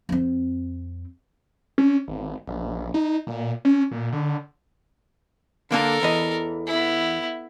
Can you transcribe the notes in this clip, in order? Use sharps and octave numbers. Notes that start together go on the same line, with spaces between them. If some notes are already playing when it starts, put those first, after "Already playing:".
F2 C4
C#4
G#1
A#1
D#4
A#2
C#4
A#2
D3
D3 A#3 D4 A4 A#4
E2 E3 D#5
B3 E4